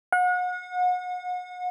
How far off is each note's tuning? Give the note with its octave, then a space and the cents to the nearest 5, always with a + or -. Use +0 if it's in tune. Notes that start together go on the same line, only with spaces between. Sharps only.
F#5 -35